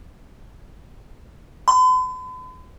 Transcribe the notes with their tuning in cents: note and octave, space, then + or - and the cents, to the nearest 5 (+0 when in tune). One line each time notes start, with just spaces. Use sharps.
B5 +45